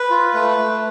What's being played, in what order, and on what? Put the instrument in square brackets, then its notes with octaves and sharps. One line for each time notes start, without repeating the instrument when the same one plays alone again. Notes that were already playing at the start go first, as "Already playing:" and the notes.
Already playing: [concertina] B4
F4
A3 B4
A3